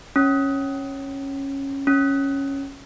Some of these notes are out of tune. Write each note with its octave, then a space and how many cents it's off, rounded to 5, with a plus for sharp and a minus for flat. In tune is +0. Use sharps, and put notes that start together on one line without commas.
C#4 -10
C#4 -5